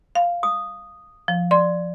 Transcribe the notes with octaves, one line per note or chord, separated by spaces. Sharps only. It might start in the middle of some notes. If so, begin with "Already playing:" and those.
F5
D#6
F3
D5 C6